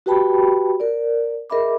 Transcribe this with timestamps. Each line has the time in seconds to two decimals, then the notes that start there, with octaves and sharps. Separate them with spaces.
0.06 F#4 G4 B4 G5 A5 B5
0.80 A#4 D5
1.50 G#4 A#4 D#5 E5 B5 D6